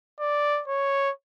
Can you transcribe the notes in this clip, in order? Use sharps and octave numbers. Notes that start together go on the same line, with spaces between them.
D5
C#5